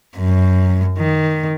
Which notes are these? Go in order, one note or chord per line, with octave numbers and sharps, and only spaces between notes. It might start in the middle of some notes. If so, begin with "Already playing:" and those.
F#2
D#3